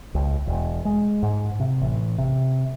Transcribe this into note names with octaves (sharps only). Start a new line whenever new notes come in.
C#2
E1
G#3
G#2
C3
A1
C3